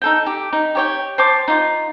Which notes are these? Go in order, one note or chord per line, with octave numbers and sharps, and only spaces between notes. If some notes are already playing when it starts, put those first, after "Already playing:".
D#4 A4 G5
G4
D#4
G4 C#5 G5
C5 A5 D6
D#4 F4